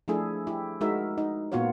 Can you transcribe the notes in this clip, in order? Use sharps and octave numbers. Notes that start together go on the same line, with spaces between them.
F3 A3 D4 E4 G#4 A4
E4 G4
G#3 D#4 F#4 A#4 E5
D#4
A#2 A#3 B3 F4 F#4 C#5